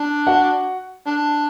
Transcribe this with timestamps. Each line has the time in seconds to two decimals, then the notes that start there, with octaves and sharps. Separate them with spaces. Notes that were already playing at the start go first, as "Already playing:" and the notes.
Already playing: D4
0.27 F#4 F#5
1.06 D4